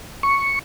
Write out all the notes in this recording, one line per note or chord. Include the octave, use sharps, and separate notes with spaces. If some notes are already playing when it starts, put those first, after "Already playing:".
C#6